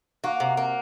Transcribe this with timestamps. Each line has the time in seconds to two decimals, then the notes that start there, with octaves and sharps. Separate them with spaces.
0.24 A#3 F#4
0.40 C3
0.57 A#3